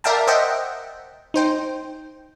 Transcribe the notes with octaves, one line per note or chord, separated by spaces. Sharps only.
A#4 D5 E5 F5 G5 A5
C5 D#5 E5 F#5 G5
D#4 C5 G5